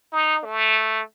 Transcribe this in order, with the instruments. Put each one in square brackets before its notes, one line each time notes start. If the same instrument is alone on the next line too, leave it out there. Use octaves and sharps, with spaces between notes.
[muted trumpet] D#4
A3